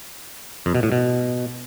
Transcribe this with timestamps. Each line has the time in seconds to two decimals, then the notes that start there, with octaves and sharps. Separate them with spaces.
0.66 F2
0.75 B2
0.83 A2
0.92 B2